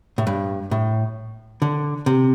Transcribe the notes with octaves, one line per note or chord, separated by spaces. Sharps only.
A2
G2
A2
D3
C3